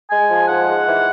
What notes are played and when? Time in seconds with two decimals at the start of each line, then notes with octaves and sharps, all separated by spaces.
0.10 G#3 G#5
0.29 F3
0.48 G#2 F#5
0.66 G#2
0.85 E3